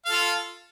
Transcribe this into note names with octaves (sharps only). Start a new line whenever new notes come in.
F4 A4 F5